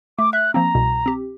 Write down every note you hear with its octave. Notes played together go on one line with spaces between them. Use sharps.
A3 D6
E5 F#6
F3 A#3 C4 A#5
C2 B2
C4 G4